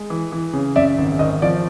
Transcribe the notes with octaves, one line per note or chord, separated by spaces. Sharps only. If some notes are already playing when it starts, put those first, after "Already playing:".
Already playing: G#3
E3
E3
C#3
F#2 D5 E5
G#1
G#1 D#5
F3 D5